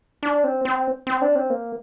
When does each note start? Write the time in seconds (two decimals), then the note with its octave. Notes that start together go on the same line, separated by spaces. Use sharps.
0.23 D4
0.44 C4
0.65 C4
1.07 C4
1.22 D4
1.35 C4
1.50 A#3